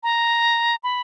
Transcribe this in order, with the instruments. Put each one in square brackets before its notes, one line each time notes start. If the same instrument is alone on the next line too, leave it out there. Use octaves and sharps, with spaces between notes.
[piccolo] A#5
B5